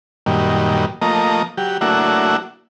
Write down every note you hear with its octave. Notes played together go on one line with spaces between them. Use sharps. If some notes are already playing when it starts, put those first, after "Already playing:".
F#2 A#2 D#3 G3
F3 A3 A#3 D#5 A#5
F#3 G4
F#3 A3 A#3 D4 E4 F#4